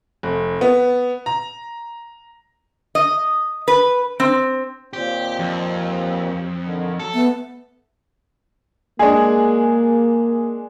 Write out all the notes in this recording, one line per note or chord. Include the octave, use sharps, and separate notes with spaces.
F1
B3
A#5
D#5
B4
C4
D#2 A#2 C4 G4
F2
D3 D#3
F#3 A4
A3 B3
G#3 A#3 D4 G#4